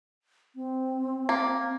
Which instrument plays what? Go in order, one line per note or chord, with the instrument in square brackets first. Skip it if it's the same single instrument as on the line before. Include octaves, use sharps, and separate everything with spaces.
[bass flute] C4
[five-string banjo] A#3